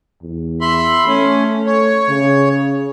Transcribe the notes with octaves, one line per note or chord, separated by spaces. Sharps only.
E2
E5 B5 C6
A3 C#4
C#5
C#3